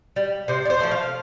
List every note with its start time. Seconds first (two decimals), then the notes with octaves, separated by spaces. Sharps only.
0.16 G3
0.48 C3 C5
0.65 D5
0.70 C5
0.80 F3 A3
0.91 F5